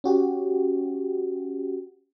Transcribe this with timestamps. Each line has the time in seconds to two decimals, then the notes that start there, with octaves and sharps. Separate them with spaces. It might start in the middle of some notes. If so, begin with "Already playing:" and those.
0.04 C#4 F#4 G4